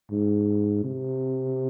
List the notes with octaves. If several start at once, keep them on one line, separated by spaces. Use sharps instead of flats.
G#2
C3